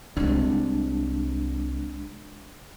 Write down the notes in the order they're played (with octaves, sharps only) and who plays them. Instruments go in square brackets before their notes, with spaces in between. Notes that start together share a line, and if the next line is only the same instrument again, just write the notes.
[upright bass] C2 C3 [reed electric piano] G#3 D4